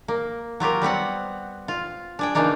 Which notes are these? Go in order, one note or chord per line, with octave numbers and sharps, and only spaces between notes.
A#3
F#3 F4 G4 A#4
G3 B3 C4 F#5
F4
D4 G#4 G5
C#3 E3 A#3 D4 D#4